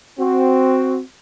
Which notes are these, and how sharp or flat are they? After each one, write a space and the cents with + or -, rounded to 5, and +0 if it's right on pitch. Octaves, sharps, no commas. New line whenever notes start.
C4 +0 F#4 +0